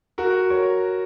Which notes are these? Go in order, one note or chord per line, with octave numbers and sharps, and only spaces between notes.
F#4 A#4
A#4 C#5